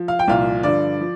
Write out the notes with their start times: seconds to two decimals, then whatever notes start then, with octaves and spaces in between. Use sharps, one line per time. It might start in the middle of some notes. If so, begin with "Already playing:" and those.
Already playing: F3
0.08 F5
0.19 G5
0.28 C2 A#2 F3 F5
0.63 G2 D3 F3 D5
1.01 F3